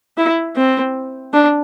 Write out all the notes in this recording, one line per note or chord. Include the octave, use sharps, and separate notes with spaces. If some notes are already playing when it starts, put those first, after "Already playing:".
E4
C4
D4